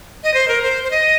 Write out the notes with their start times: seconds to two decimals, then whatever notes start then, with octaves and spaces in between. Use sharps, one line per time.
0.24 D#5
0.34 C5
0.48 A#4
0.62 C5
0.84 C5
0.91 D#5